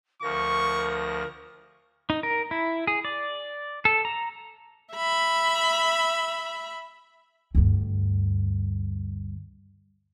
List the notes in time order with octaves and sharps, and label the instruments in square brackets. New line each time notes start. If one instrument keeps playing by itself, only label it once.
[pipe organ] D2 F3 A#6 [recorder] A#4 [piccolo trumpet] C#6
[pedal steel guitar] D#4
A#4
E4
G#4
D5
A4
A#5
[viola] E5 B5
[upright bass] D2 G2